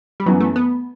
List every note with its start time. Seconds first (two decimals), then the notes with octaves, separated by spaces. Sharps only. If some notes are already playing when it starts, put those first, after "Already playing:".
0.20 G3
0.26 F#2 E3 F#3 B3
0.40 A3
0.56 B3